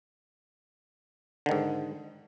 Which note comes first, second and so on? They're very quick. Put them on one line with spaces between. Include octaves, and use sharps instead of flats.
D3 D#3 G#2